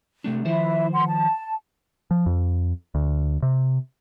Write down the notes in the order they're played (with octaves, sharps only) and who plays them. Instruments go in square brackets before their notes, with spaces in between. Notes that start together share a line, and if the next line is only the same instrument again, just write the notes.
[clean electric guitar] C3 A3 D4
[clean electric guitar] D#3 F3 C5 [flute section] E4 E5
[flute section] F#5 C6
A5
[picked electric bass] F3
F2
D2
C3